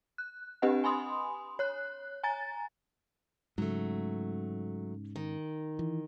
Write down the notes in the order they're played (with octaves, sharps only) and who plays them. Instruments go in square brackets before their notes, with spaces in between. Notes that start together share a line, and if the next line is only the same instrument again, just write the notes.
[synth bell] F#6
C4 D4 G4 B4 D#5 F#5
G#5 B5 C6 D#6
C#5 F#6
G#5 A#5 A6
[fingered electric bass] G#2 C#3 [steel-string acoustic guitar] F#3 A3
[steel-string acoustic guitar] D#3
[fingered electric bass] E3